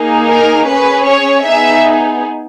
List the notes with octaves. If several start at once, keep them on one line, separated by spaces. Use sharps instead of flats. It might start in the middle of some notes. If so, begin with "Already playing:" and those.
Already playing: A#3 D#4 G#4
A#4
C#4 G#4 B4
C#5
B3 D#4 G#4 E5